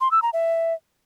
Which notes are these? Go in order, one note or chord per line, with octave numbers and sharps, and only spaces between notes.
C6
E6
A#5
E5